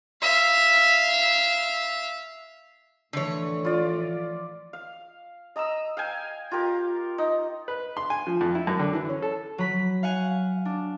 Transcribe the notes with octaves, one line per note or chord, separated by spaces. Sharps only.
E5 F5
A2 D3 E3 F3 C#5
F4 D5
F5
D#5 A#5 D#6 E6
F5 G5 G#5
F4 G4 A#4
D#4
B4
C6
G#5
F3
F2
E4
F#2
D3
E3
C#4
A4
F#3 B5 B6
F5 F#5 G#5
D4